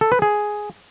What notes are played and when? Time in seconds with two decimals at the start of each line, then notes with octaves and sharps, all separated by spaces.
0.01 A4
0.12 B4
0.22 G#4